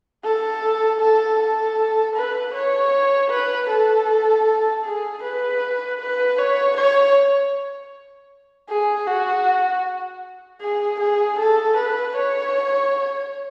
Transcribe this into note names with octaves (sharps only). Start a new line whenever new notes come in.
A4
A4
A4
B4
C#5
B4
A4
G#4
B4
B4
C#5
C#5
G#4
F#4
G#4
G#4
A4
B4
C#5